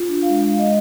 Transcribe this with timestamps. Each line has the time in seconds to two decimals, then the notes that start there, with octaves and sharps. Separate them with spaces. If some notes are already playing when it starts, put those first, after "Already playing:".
Already playing: F4
0.08 D4
0.22 F5
0.29 G#3
0.51 G#3 F5
0.59 D#5